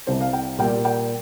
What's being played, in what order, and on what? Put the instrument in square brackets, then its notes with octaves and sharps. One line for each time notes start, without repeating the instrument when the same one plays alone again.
[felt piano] C2 C3 G3 C5
F5
G5
A#2 G3 A#3 G5
G5